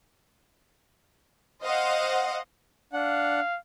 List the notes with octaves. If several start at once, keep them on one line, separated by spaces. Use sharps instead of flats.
C5 D#5 F5 F#5
D4 F5 F#5